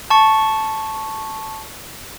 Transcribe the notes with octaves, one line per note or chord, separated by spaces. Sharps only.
A5 C#6